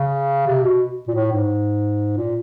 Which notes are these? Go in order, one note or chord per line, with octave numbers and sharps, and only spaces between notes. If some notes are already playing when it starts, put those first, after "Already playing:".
Already playing: C#3
C3
B2
A#2
A2
G#2
A#2